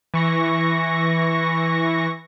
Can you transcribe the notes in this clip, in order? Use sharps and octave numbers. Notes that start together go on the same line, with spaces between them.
E3 C#6 A#6